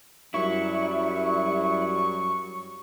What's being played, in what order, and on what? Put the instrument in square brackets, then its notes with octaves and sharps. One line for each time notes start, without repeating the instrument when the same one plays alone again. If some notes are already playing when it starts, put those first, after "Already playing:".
[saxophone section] F#2 F#3 G3 [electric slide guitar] E4 [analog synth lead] C#6